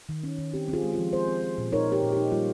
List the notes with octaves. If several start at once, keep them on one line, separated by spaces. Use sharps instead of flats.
D#3
C#4
D#3
C4 G4
C4
F4 G#4
G#3
F4
F3
C4 G#4 C5
C4
C4
A#2
D#4 A#4 C#5
D#4 G4 A#4
A#2
G4
D#4
G3 F4